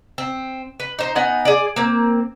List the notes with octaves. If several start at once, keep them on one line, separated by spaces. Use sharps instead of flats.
C4
B4
D#4 C5
B3 D#4 F#5 G#5
G#4 D5
A#3 C4